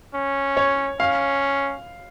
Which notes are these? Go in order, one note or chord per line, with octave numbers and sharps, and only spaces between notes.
C#4
C#5
C#4 F5